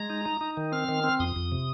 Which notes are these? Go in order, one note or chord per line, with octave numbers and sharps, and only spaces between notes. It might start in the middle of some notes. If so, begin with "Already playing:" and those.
Already playing: G#3 A#5
D#4
D#4
D#4
D#3
C4 F6
D#3
C4
F2 D#6
F2
C3